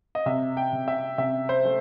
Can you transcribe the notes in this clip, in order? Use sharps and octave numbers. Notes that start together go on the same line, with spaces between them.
D#5
C3 E5
G5
C3
E5
C3 E5
C5
A3